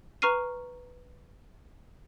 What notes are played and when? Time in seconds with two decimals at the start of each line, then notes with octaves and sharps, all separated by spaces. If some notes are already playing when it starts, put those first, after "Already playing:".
0.22 B4 A#5 C#6 F6 C7 D#7